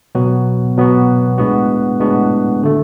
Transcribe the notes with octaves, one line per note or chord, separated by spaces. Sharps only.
B2 F#3 B3 F#4
B2 F#3 B3 F#4
A2 G#3 B3 D4 F#4
A2 G#3 B3 D4 F#4
D3 A3